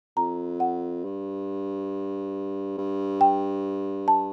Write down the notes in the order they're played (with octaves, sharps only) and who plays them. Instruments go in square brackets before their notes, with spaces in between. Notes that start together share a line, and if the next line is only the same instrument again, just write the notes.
[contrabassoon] F2 [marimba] A#5
[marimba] F#5
[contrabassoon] G2
G2
[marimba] G5
A5